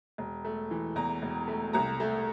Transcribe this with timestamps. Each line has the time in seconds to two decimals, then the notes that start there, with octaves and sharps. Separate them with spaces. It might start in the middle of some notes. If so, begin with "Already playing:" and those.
0.18 E1
0.45 A3
0.71 E3
0.96 E2 A#5
1.22 E1
1.48 A3
1.73 C2 A#5
2.00 A3